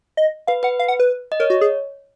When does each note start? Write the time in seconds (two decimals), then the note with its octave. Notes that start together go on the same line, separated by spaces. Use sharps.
0.17 D#5
0.47 B4 F5
0.63 B4 F#5
0.79 F5
0.88 F#5
1.00 B4
1.32 D#5
1.40 A#4 C#5
1.50 F#4
1.61 G#4